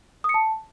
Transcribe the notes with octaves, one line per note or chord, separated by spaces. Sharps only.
D#6
C#7
A5